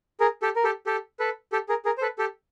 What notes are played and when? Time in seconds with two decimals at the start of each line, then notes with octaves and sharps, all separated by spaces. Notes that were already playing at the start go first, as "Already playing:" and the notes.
0.20 G#4 A#4
0.42 G4 A4
0.56 A#4
0.64 G4 A4
0.86 G4 A4
1.19 A4 B4
1.52 G4 A4
1.69 G#4 A#4
1.85 G#4 A#4
1.98 C5
2.02 A4 B4
2.18 G4 A4